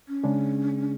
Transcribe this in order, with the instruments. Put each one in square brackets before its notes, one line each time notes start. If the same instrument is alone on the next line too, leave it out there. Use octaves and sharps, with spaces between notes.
[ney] C#4
[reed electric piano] C#3 G#3 D4 G#4